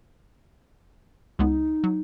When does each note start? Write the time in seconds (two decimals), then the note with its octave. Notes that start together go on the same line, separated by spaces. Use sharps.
1.39 C#2 G#3 B3 D#4
1.84 F#3